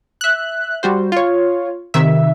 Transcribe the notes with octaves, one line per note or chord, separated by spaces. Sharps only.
E5 F#6
G3 F#4 C5
F4 C#5
C3 D#3 E5